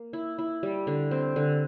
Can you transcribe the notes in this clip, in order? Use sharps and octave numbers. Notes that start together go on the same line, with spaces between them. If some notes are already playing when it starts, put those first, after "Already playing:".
Already playing: A#3
E4
E4
G3
D3
C4
D3